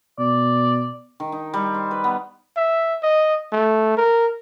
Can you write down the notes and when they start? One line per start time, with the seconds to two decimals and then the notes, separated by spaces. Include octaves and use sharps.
0.19 B2 D5
1.20 D#3
1.32 D#4
1.54 G3
1.74 C5
1.91 B4
2.04 B3
2.57 E5
3.03 D#5
3.52 A3
3.97 A#4